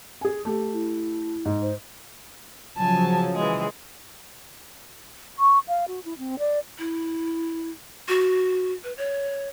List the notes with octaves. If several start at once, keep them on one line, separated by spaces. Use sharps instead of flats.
G#4 G#5
A3 G4
E4
G#2
C5
C#3 F3 F#3 G#5 A5
E3 G#3 G#4
C#6
F5
F#4
E4
C4
D5
E4
F#4
B4
C#5